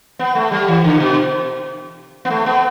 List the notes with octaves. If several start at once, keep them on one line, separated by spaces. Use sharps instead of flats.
B3
A3
G3
E3
D3
B2
B3
A3
B3